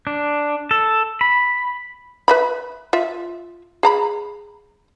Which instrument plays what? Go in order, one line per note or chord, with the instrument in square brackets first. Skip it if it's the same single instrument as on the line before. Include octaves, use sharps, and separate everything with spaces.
[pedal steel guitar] D4
A4
B5
[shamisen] B4 E5 B5
F4 E5
G#4 A#5 B5